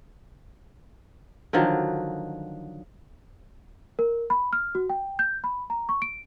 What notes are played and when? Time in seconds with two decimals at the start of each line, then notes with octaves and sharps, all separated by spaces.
1.53 D3 D#3 F3 F#3
3.99 A#4
4.30 B5
4.53 F6
4.75 F#4
4.89 G5
5.19 G6
5.44 B5
5.70 A#5
5.89 C#6
6.02 D7